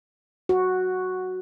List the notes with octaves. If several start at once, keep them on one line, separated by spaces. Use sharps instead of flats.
F#4